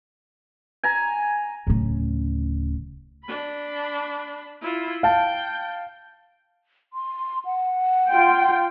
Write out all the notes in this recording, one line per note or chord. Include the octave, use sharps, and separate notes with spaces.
G#5 A#5
D1 C#3
D4 B5
E4 F4
F5 G5 A5
C6
F#5
F4 G5